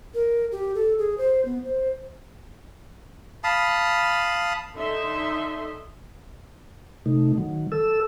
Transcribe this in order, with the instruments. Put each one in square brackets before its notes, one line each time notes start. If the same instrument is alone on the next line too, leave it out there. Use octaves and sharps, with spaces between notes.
[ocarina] A#4
G4
A4
G#4
C5
B3
C5
[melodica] F5 A5 B5 D#6
[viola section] D3 D#4 D#5 E5 C6
[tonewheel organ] C3 A3 D#4
D#3 F#3
A4 E6